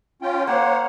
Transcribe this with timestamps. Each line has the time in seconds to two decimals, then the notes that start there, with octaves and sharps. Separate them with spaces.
0.22 C#4 F4 G5
0.47 A#3 C5 C#5 F#5